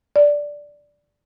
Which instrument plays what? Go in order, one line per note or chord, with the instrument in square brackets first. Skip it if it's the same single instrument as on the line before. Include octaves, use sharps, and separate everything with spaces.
[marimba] D5